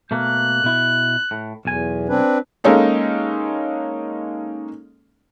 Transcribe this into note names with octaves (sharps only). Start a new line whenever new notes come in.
B2 A3 A#3 F#6
B2 E4
A2
B1 E2 G#5
C4 D4 B4
G#3 A#3 C#4 D#4 A4